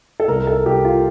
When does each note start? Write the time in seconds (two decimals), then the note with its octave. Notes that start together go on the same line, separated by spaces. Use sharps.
0.20 A4
0.28 C2 A#4
0.47 A4
0.66 C2 G4
0.85 F4